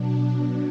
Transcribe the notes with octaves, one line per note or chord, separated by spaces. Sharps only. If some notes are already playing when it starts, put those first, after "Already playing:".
Already playing: B2 F#3 D4